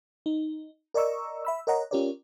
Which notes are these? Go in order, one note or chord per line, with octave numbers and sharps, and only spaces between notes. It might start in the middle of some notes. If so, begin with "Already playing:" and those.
D#4
A#4 D5 D#5 A#5 C#6 E6
E5 B5 E6
A#4 C#5 D#5 F#5 A#5
C#4 F4 G4 A#4 C#5 D5